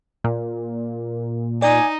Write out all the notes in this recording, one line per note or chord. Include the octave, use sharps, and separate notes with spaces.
A#2
D#4 D5 G#5